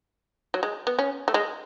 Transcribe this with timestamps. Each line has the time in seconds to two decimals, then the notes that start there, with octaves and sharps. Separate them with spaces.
0.54 F#3
0.63 G#3
0.87 B3
0.99 C#4
1.28 A3
1.34 G#3